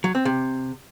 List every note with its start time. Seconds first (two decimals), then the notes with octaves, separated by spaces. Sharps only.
0.04 F#3
0.15 C4
0.25 C3